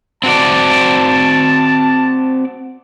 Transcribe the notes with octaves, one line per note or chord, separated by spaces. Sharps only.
C4 F#4 D5 A5